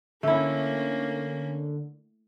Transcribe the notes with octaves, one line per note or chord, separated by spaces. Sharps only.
D3 A3 A#3 C#4 E4